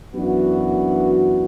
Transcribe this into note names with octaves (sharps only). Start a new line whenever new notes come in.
F#2 E3 B3 D4 F#4